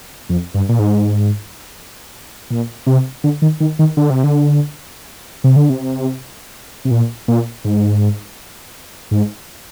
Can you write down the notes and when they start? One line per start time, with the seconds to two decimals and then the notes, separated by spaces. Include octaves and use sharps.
0.29 F2
0.54 G2
0.69 A#2
0.79 G#2
2.50 A#2
2.86 C3
3.24 D3
3.42 D#3
3.60 D#3
3.79 D#3
3.97 D3
4.10 C3
4.24 D3
5.44 C3
5.56 D3
5.70 C3
6.85 C3
6.91 A#2
7.28 A#2
7.65 G#2
9.11 G#2